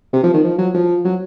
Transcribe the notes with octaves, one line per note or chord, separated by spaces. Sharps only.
C3
F3
D#3
F3
F#3
F3
F#3